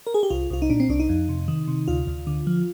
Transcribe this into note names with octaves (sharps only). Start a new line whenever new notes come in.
A#4
G#4
G4
C2 F4
C2 F4
D#4
A#2 D4
C4
C2 D4
D#4
F2
C3
D#3
C3
D2 F4
D2
D3
F3